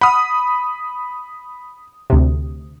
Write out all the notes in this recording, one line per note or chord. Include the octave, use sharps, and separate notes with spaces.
F#5 B5 D#6 F6
D2 C3